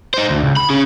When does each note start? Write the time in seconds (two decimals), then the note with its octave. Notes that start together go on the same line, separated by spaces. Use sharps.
0.14 D#4 C5
0.30 D2
0.43 C#2
0.57 B5
0.70 C#4 G#4